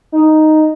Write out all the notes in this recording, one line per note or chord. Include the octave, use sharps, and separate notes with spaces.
D#4